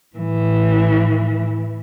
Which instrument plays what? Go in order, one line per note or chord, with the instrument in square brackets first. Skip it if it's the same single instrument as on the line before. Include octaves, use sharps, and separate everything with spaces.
[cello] A2 E3